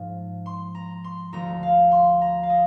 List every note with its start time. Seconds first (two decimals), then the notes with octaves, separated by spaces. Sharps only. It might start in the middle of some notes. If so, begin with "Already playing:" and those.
Already playing: G#2 F3
0.46 C6
0.75 A#5
1.04 C6
1.33 D2 D3 F3 A#5
1.63 F5
1.92 C6
2.21 A#5
2.43 F5
2.50 D#5